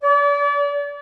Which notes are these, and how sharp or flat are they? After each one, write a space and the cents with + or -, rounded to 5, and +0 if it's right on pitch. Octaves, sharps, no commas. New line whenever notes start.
D5 -35